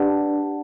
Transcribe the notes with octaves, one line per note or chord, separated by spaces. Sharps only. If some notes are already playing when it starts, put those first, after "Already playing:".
Already playing: D4 G4 B4 D5 F#5 A5